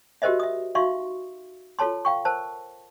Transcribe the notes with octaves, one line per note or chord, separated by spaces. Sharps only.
F#4 G4 A#4 C5 D#5 E5
E5 D#6
D#4 F#4 E5 F5 C6 C#6
F4 A4 C#5 A5 C6
F5 G5 C#6
A#4 C5 A5